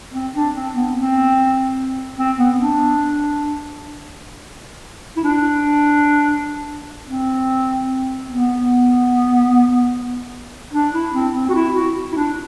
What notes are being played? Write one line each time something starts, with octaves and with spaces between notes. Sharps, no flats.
C4
D4
C4
B3
C4
C4
B3
D4
E4
D4
C4
B3
D4
E4
C4
C4
F#4
E4
F#4
E4
D4